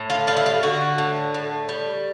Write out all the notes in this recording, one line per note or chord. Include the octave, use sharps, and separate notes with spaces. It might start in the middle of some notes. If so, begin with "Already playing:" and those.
Already playing: A2
F4
G3 F4
E4
F4
D3 F#4
A2
A2
G3